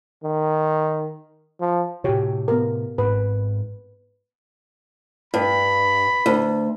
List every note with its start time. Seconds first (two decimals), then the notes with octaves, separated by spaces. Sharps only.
0.24 D#3
1.60 F3
2.04 A2 C3 F#4 G4 C#5
2.48 B3 A#4
2.98 G#2 C4 B4
5.34 G2 B5
6.26 D2